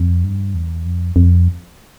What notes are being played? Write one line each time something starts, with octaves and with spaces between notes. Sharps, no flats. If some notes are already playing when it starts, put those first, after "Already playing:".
Already playing: F2
G2
E2
F2
F2